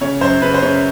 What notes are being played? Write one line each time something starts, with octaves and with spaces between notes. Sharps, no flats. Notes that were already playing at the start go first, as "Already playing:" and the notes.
C#3 C#5
F#2 C5
C#3 B4
C5
C#3 C#5